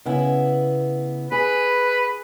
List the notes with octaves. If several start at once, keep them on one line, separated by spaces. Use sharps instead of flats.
C#3 B3 E4
G#4 B4